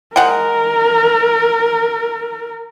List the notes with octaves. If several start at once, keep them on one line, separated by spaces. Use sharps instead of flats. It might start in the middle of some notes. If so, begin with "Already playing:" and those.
G#3 A#4 F#5 G5